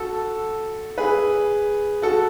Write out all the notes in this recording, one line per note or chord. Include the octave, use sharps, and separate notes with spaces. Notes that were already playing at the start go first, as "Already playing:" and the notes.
Already playing: F#4 A4
G#4 B4
F#4 A4